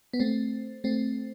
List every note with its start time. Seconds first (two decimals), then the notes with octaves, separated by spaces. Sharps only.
0.13 B3
0.20 A3 C4
0.84 A3 C4